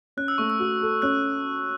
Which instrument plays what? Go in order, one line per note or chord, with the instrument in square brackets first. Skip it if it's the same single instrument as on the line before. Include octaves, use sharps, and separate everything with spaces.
[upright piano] C#4 [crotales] F#6
[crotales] E6
[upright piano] A3 [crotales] C#6
[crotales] E6
[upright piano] F#4
A4
[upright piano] C#4 [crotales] F#6